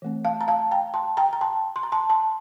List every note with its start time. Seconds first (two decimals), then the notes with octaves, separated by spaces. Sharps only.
0.02 E3 A3 C4
0.25 F5 A5
0.41 A#5
0.48 F5 A5
0.71 G5 A#5
0.94 A5 C6
1.17 G5 A#5
1.33 A#5
1.41 A5 C6
1.76 C6
1.83 A#5
1.92 A5 C6
2.10 A5 C6